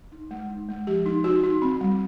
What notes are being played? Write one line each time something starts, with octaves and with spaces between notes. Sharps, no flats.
D#4
G#3
D#4
G#3
F3 G4
D#4
D#4 F#4
D#4
C4
G3